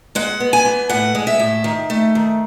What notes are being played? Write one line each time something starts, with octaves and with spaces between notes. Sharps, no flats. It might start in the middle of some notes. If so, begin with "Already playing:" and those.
G#3 F#5
B3
G#5
E3
A2 F#5
G#3
E5
A2
D#3
A3
D#3